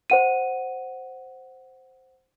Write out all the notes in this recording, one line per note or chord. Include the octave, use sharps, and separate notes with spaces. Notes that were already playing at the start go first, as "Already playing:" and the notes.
C5 F#5 D#7